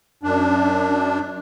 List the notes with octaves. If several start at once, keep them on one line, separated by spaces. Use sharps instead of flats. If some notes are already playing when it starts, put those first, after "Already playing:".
F#2 D4